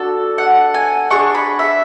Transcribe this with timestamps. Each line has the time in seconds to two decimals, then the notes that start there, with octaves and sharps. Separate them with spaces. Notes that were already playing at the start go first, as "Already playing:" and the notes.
Already playing: D4 F#4 A4
0.38 F#5
0.74 G#5
1.10 D4 G#4 C#6
1.35 B5
1.59 E5